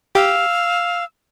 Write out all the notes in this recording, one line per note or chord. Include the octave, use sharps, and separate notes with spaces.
G4 F5 E6